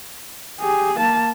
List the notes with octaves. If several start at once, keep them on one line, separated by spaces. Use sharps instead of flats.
G4 G#4
A#3 A5